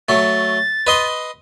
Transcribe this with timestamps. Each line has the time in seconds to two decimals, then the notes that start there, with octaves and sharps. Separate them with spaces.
0.09 F#3 A3 A6
0.87 B4 D#5 C6